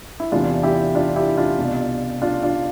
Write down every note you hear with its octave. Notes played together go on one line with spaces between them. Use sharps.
E4
E2 C3 E3 D4 F4
E4 G4
D4 F4
E4 G4
D4 F4
C2 B2
D4 F4
D4 F4